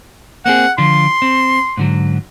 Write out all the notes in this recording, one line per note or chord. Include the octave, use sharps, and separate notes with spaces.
A#3 C4 G#4 F#5
D3 F3 F4 C6
C4
G#2 D3 F#3